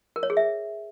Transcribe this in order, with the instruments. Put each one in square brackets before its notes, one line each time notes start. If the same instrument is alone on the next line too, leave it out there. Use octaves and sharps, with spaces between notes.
[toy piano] A#4
C#5
G#4
E5